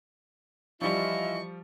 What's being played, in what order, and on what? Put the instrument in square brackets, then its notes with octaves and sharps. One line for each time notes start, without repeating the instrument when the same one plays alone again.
[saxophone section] E3 E4 F4 [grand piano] F3 G3 [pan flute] D#5 [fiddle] C#6